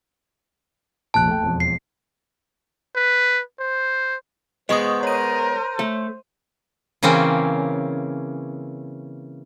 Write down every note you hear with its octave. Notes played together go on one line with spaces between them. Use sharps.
F1 A#1 F2 A5 F#6
A3 G5
E1 F2
C7
B4
C5
G#3 B3 C5 D#5 C#6 D#6
A#4 C#5 D#7
A3
C#3 E3 A#3 C4 C#4